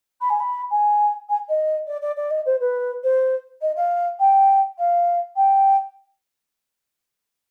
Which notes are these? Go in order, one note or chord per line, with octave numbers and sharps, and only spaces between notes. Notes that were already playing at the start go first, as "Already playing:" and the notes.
B5
G#5
B5
G#5
G#5
D#5
D5
D5
D5
D#5
C5
B4
C5
D#5
F5
G5
F5
G5